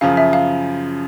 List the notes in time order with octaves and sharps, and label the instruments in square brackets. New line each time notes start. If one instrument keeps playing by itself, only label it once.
[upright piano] F#2 C#3 F3 [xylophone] F5
[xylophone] E5
F5